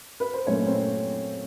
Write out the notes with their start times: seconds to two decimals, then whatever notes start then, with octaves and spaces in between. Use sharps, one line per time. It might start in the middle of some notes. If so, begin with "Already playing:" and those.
0.20 B4
0.34 C5
0.46 A#2 F#3 A3 C#4 C#5
0.66 C4 C5